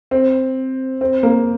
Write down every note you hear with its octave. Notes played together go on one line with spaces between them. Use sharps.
C4
C4
A#3